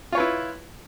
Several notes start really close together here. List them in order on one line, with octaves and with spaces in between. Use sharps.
F4 C#5 B4 E4